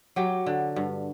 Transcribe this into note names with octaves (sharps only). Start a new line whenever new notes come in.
F#3 G4
D3
G2